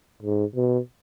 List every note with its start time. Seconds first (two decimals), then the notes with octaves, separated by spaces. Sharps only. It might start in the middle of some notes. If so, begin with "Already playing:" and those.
0.22 G#2
0.56 B2